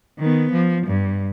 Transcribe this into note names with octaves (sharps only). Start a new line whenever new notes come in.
D#3 B3
F3
G2